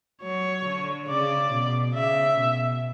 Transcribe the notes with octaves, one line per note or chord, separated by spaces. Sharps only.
F#3 C#5
D3
C#3 D5
B2
C#3 E5
B2